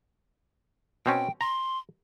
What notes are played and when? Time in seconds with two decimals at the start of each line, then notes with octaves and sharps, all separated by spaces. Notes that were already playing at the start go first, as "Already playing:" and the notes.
1.06 B2 C4 C#4 G5
1.41 A#5 C6